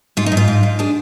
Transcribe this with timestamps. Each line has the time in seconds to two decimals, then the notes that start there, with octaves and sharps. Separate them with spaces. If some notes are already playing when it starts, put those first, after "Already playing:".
0.17 G#2 F4
0.26 D#4
0.32 G#2
0.37 F4
0.48 G#2
0.63 G#2
0.79 D4 G#4